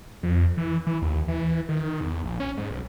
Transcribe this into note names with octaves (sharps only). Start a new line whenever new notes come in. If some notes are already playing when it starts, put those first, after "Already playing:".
F2
E3
E3
D#2
E3
D#3
E2
A#1
C#4
G#2
B1